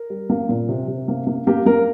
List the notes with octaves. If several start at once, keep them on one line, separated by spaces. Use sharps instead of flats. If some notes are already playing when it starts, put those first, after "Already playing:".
Already playing: A#4
G3
A#3
A#2
C3
C3
A#3
A#3
A#3 G4
A#3 A#4